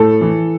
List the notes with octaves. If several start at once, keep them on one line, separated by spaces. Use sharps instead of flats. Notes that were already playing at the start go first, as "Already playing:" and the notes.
Already playing: A2 A4
E3